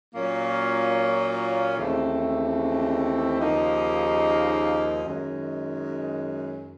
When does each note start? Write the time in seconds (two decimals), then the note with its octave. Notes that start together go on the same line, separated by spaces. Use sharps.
0.14 A#2 F#3 A#3 C#4 F4
1.76 D#2 C#3 E3 A3 C4
3.40 D#2 C#3 F3 A#3 D#4
5.03 F#2 D#3 G#3